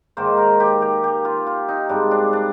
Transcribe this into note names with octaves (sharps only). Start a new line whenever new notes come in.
G#2 D#3 A#3 C5
A#4
G4
G4
G4
F4
F4
D#4
G#2 G3 C4 D4
D4
D4